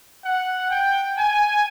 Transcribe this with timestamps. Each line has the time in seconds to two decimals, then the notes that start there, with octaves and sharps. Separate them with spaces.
0.25 F#5
0.70 G5
1.18 G#5